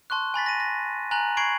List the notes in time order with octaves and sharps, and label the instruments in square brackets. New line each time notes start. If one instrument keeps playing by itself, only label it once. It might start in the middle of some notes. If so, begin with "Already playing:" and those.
[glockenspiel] A5 C6 C#6 F#6
G#5 B5 A6 B6
A#6 D#7
A#6
G#5 A#5 F#6 F#7
B5 C#6 G#6 C7 D7 F#7